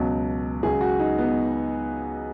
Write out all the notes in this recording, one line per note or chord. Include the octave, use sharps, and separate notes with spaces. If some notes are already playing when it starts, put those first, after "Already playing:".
Already playing: C#2 B2 F#3
C#2 C#3 F#3 G#4
F#4
D#4
B3